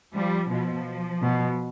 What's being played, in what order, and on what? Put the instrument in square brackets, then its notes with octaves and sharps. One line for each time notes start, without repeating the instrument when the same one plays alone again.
[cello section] F3 G3
B2 F3
B2